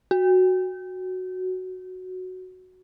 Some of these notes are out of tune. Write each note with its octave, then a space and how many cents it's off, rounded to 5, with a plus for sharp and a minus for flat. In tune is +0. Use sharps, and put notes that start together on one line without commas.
F#4 +0